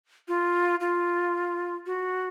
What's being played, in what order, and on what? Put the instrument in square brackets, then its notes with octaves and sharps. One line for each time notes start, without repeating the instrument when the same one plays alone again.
[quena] F4
F4
F#4